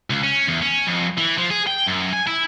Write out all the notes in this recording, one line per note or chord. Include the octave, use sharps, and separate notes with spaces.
C#2
C#4
E2
C#4
F2
E3
F3
G#4
G5
F#2
G#5
E4